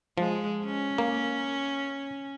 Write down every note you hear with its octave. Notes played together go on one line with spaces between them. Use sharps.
F3 G#3
C#4
A#3